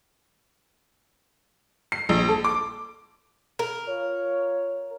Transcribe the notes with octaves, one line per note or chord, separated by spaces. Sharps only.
C7
A#1
A4
D6
A#4
F4 C#5